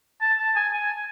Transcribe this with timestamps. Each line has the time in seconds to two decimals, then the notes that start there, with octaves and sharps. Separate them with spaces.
0.21 A5
0.39 A5
0.56 G#5
0.73 G#5